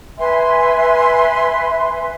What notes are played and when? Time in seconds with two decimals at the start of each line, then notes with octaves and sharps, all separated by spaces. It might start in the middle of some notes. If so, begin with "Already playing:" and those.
0.19 B4 E5 G#5 C6